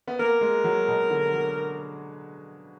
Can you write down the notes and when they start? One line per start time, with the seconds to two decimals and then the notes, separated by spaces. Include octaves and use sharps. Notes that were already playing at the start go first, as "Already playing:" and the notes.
0.07 B3
0.19 A#3 A#4
0.41 G#3
0.64 F#3
0.88 B2
1.10 D3
1.33 F#3